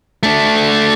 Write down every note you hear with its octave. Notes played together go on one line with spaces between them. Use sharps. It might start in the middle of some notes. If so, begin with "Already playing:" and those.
A3 D4